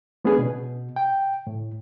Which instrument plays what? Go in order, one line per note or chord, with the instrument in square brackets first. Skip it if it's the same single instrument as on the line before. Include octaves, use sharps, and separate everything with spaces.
[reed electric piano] A3 B3 C#4 D4 G#4 B4
B2
G5
A2